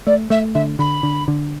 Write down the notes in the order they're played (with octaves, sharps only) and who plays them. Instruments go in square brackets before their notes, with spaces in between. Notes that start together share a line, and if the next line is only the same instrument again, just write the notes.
[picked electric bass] A3 [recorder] D5
[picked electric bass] A3 [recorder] E5
[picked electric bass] D3 [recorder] E5
[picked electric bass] D3 [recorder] B5
[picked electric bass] D3
D3